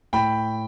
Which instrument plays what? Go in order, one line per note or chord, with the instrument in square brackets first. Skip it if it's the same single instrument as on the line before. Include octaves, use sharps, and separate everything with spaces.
[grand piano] A2 G5 B5